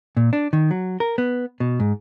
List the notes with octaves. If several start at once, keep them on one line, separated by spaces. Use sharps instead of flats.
A#2
D4
D#3
F#3
A#4
B3
B2
G#2